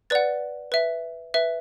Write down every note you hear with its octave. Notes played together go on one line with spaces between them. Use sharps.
B4 D5 F#5 A6
B4 E5
B4 E5